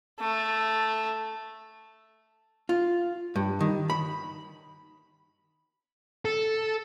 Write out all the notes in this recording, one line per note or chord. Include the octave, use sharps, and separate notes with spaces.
A3
F4
G2
D#3
B5
A4